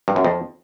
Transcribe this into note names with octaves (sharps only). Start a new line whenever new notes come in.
G2
F#2
F2